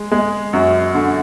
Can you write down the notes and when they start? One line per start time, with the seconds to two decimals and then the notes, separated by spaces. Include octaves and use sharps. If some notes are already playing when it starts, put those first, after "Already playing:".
Already playing: G#3
0.12 G#3
0.53 F#2
0.95 D3